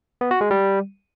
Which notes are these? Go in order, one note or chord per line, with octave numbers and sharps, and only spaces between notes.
B3
F#4
G#3
G3